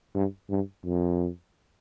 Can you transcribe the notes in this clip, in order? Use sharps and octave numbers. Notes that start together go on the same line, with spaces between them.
G2
G2
F2